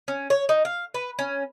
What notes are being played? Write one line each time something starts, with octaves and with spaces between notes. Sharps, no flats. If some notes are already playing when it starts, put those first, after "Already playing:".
C#4
C#5
D#4
F5
B4
C#4